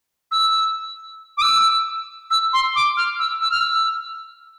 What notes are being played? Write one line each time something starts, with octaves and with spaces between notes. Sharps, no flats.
E6
D6
E6
E6
C6
D6
F6
E6
E6
F6
E6